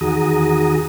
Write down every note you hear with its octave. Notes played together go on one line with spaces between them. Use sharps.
E2 D#3 F#4 G#4 A#5 D#6